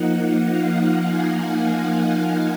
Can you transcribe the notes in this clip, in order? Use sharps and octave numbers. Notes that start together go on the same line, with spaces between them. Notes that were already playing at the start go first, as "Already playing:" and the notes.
Already playing: F3 A#3 D#4 F#5
F#5
F5
F#5
G#5
F#5
F5